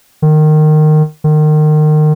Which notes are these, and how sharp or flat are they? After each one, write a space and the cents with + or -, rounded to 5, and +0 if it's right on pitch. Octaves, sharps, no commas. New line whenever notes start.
D#3 -20
D#3 -30